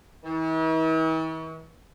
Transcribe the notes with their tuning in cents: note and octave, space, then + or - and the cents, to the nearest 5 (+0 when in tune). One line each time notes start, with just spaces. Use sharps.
E3 -45